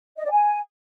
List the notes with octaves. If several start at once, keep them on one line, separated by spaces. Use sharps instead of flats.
D#5
D5
G#5